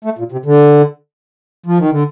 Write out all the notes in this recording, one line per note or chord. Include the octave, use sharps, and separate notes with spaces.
A3
A#2
C3
D3
F3
D#3
D3